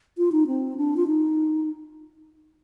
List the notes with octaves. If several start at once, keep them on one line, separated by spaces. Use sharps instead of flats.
F4
D#4
C4
D4
F4
D#4